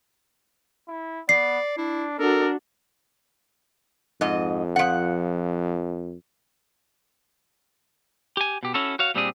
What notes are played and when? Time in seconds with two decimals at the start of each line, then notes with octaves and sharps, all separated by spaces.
0.88 E4
1.29 B3 D5 C7
1.77 D4 E4
2.19 D4 F#4 A4 A#4
4.21 F2 G#2 D#5
4.76 F3 F#5
8.37 G4 G#5
8.63 B2 G4
8.74 C#4 E4 F#4 A4
8.99 F#4 C#5 F5
9.14 A#2 G3 C4 D4 G4 G#4